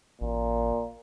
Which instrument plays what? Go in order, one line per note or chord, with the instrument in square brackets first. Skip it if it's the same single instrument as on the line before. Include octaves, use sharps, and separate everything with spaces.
[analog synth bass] A1 [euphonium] A#2